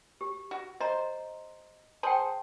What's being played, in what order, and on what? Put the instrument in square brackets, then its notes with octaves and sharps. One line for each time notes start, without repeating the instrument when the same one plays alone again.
[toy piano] G4
[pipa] F#4
[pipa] C5 [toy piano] D#5 A#5
[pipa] G#4 C5 [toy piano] G5 A5